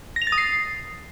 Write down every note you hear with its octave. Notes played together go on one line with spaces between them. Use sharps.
A#6
F7
A6
D#6
C7